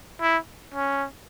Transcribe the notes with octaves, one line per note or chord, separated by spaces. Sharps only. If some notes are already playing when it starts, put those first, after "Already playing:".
E4
C#4